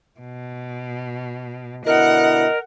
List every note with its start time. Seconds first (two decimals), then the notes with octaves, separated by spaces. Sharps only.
0.20 B2
1.86 B2 D3 E4 A#4 D#5 F#5